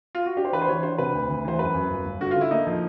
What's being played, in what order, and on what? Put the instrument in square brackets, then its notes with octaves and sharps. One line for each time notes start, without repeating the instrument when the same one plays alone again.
[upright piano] F4
F#4
[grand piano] D4 [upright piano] G4
[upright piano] C5
[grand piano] E3 [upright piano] B4
[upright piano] C5
[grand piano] E3 [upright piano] C#5
[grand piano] D4 [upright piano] C5
[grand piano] C3 [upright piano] B4
[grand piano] D2
D2
[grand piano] E3 [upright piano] C5
[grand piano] F#2 [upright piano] B4
[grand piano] F#2
G1
G1
[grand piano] D3 [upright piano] F#4
[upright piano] F4
[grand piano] D3 [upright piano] E4
[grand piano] A#3 [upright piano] D#4
[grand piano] F3